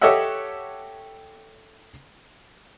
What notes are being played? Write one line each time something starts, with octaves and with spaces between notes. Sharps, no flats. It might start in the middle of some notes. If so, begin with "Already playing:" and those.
G4 A4 C#5 D#5 E5 F#5